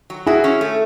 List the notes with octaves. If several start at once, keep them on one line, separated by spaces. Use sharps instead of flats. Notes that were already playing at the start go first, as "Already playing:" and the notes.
F#3
E4 F#4 G#4
C#4
A3